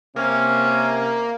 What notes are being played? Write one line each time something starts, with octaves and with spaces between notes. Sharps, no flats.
C3 A#3 C#4